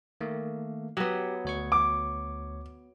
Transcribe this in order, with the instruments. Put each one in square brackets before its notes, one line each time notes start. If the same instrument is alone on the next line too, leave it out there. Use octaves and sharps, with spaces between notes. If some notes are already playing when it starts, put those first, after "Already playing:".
[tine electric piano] D#3 A3 A#3
[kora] F#3 B3 [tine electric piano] G4
[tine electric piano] D2 C#5 C#6
[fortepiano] D6